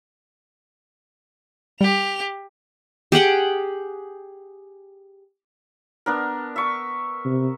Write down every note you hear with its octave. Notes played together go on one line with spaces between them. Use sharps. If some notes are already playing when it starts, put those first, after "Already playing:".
G3 G4 F7
G4 G#4 F#5 G5
B3 D4 A#4
E5 C#6 D6
C3